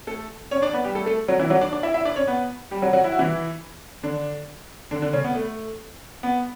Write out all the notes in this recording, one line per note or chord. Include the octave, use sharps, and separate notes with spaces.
A3 A4
C#4 C#5
D4 D5
B3 B4
G3 G4
A3 A4
A3 A4
F#3 F#4
E3 E4
F#3 F#4
D4 D5
D4 D5
E4 E5
E4 E5
D4 D5
C#4 C#5
B3 B4
G3 G4
F#3 F#4
F#3 F#4
E4
F#4
E3 E4
D3 D4
D3 D4
D3 D4
C#3 C#4
B3
A3
B3